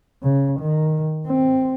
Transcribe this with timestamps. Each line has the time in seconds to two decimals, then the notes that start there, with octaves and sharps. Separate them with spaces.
0.23 C#3
0.60 D#3
1.27 C4